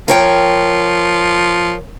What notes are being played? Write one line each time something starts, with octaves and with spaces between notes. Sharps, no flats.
F3 A#4 C#5 G5